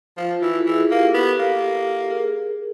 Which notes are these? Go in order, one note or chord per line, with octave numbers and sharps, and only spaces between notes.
F3 F4
E3 E4 F#4
A4
E3 F#4 G#4
A#3 G4 A4
B3
A#3
G#4 A#4